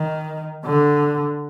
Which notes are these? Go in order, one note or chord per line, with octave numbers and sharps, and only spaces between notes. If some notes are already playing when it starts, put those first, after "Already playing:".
Already playing: D#3
D3